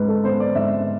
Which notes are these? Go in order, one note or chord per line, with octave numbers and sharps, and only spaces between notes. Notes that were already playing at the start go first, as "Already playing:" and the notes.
Already playing: G#2 G#3 B4
A4
B3 C5
D5
G#2 E5